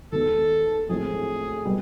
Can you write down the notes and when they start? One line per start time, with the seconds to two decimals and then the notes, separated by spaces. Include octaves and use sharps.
0.12 D#2 D#3 G#3 B3 A4
0.89 A#1 A2 E3 G#3 C4 G#4
1.65 B2 G3 B3